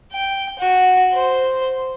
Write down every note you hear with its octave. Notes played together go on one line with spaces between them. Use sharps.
G5
F#4
C5